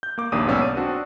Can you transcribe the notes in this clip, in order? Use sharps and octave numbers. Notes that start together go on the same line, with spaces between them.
G6
A#3 D6
A#1 D#2 A#3 D4 D#6 D#7
B1 G#2 B3 C#4 D5 E6
D#7
C4 D4 F#4